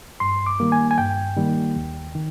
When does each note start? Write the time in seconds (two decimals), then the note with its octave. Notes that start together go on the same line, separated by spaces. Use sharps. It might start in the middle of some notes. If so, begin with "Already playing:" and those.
0.20 G2 C6
0.46 D6
0.60 D#3 G3 A#3
0.72 G#5
0.91 G#5
0.98 G2 G5
1.37 D#3 G3 A#3
1.76 D#2
2.15 D#3